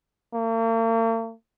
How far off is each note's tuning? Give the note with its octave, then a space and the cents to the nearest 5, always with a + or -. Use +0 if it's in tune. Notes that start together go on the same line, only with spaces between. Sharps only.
A#3 -45